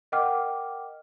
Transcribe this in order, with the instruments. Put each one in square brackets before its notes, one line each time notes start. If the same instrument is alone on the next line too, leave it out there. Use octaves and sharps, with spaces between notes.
[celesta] A#4 D#5 F#5 G5 D6 F6